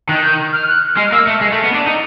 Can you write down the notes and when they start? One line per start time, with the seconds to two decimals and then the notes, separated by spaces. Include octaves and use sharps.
0.09 D#3 F#6
0.23 G6
0.53 F6
0.68 F#6
0.97 G#3 F6
1.13 A#3 E6
1.27 A3
1.41 G#3
1.52 A3
1.64 B3
1.74 D4
1.86 D#4